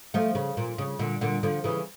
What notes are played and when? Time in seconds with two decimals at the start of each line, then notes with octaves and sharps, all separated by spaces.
0.14 F3 A3
0.35 C#3
0.57 A#2
0.78 C#3
0.99 A#2 D3
1.21 A#2 D3
1.43 D3 F3
1.64 C#3 E3